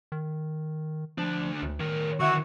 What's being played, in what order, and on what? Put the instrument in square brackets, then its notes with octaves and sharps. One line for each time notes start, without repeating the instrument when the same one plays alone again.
[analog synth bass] D#3
[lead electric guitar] D2 D4 [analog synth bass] F3
[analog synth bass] D2
[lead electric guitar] A2 A#4 [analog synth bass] D#3
[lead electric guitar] D3 E4 [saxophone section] F#4 E5